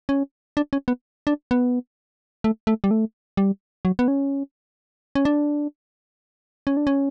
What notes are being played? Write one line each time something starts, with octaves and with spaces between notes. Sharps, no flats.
C#4
D4
C#4
B3
D4
B3
A3
A3
G3
A3
G3
F#3
B3
C#4
C#4
D4
C#4
D4
C#4